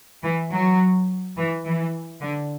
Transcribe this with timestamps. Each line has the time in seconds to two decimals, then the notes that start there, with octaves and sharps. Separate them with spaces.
0.23 E3
0.51 F#3
1.37 E3
1.65 E3
2.21 D3